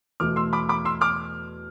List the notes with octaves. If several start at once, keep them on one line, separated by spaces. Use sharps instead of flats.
E2 B2 A3 D6 F6
C6 E6
B5 D6
B5 D6
C6 E6
D6 F6